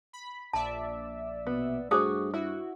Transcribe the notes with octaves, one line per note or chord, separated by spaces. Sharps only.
B5
A#1 D5 E5 A5
B2 B3
G2 A3 F#4 G#4 C5 D6 D#6
E4 F#4